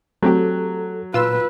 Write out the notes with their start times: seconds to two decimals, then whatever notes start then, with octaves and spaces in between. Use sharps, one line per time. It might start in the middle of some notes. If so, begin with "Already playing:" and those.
0.23 F#3 A3 C4 G4 A4
1.14 A#2 F4 B4 E6